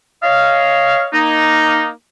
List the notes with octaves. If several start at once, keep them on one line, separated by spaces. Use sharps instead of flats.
C#5 D#5 F5
A#3 D#4